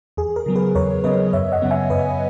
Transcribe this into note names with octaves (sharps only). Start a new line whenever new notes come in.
E2 G#4
A#4
C#3 F#3 B3
G#4 B4
E2 A#4 C#5
C#3 F#3 B3 B4 D#5
F#2 C#5 E5
D#5 F#5
C#3 F#3 B3
E5 G#5
F#2 B4 D#5